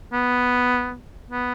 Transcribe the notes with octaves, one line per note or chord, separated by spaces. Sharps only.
B3
B3